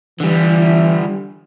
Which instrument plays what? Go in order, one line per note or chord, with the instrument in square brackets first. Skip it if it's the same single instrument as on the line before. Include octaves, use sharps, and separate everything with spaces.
[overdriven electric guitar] D3 G3 [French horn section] E3